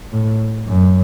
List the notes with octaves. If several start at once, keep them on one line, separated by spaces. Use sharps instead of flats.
A2
F#2